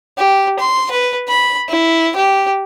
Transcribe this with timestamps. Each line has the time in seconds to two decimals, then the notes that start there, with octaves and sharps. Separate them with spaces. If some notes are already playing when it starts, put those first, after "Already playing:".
0.18 G4
0.59 C6
0.91 B4
1.28 B5
1.69 E4
2.16 G4